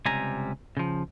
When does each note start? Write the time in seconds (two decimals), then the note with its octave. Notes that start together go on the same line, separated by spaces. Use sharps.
0.06 C#2 C3 G3 G#5 A#5
0.77 C#3 F3